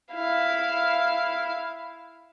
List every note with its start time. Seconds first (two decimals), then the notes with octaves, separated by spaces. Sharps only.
0.13 E4 F5